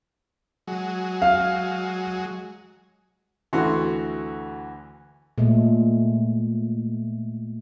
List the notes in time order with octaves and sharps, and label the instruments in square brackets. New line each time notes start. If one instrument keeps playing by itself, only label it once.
[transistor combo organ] F#3 G#3
[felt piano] F5
[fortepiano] D2 E3 A3 F#4 F#5 C6
[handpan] A#2 G#3 A3